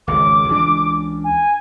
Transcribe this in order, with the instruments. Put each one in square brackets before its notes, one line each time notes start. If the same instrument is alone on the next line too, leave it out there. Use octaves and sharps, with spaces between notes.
[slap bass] G#1 C#2 [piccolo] D6
[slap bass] C#2 E3 D4
[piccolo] G#5